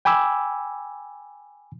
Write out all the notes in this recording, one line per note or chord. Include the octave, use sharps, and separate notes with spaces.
G5 G#5 B5 D6 E6